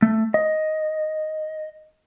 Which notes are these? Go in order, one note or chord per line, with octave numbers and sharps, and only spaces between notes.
A3
D#5